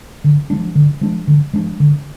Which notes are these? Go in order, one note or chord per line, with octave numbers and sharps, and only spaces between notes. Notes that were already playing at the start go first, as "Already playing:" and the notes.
D3
F3 G#3 D4
D3
F3 G#3 D4
D3
F3 G#3 D4
D3